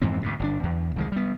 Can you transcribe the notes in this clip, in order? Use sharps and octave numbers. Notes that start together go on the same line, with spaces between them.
F2 G#2 E3 C4
D2 G#2 B2
G1 C3 D4
E2
C2 D#3 G#3
G3 B3